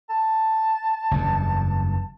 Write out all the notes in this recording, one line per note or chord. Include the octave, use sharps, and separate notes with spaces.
A5
F#1 E2 G2